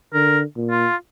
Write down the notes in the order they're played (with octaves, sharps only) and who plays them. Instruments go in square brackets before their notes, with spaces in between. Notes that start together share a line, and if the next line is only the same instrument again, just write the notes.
[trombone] D3 [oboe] A#4
[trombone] A#2
[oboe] F4